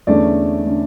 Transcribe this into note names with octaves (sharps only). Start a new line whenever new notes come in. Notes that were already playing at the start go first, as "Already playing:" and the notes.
E2 D3 A3 C#4 D5
D3 A3 C#4